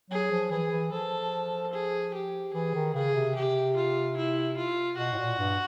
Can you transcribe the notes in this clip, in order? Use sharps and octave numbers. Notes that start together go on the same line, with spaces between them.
F#3 G#4
F3
E3 G#4
E3
F3 A4
G#4
G4
E3 G#4
D#3
C#3 G#4
C3
G4
F4
E4
F4
B2 F#4
A2
A#2
G2